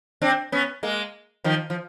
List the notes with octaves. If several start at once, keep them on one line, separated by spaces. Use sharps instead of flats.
C4 D4
B3 C#4
G#3 A#3
D#3 F3
F3